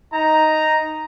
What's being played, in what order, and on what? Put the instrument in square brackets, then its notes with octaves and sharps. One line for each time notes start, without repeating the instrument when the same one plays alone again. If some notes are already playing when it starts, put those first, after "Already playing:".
[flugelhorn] D#4 [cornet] A#5